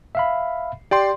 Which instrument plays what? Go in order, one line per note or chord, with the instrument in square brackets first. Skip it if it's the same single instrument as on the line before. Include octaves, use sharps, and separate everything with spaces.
[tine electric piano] E5 F5 B5
[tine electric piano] G4 [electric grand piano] D5 G5 C6